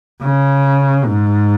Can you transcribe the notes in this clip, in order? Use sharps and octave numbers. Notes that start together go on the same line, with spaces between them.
C#3
G#2